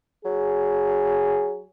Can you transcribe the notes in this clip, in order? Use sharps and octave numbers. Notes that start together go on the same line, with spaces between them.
F#3 G#4